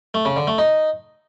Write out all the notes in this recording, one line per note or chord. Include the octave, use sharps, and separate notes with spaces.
A3
C#3
D3
A3
D#4